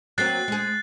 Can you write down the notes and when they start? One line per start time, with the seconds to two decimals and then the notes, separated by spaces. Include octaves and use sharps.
0.18 F#3 A#3 C4 F#6 A6 C7
0.48 G#3 G#4